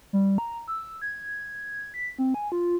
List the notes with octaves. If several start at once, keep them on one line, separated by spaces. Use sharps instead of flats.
G3
A#5
E6
G#6
B6
C4
G#5
F4